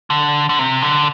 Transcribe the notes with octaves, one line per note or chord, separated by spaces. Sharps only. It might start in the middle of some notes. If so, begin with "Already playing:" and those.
D3
D3
C3
D3